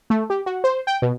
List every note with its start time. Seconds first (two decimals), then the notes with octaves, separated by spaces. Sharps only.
0.10 A3
0.30 G4
0.46 F#4
0.64 C5
0.87 G5
1.02 B2